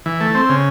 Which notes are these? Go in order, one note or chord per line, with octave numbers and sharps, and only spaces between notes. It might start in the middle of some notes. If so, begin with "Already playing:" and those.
E3
A3
C4
C#3